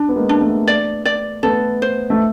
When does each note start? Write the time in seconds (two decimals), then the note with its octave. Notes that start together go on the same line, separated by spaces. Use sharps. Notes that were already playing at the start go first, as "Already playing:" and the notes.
Already playing: D4
0.09 B3
0.15 G#3 A#3
0.29 D4
0.41 A3 B3
0.68 D5
1.05 D5
1.43 A3 B3 A4
1.82 C5
2.10 A3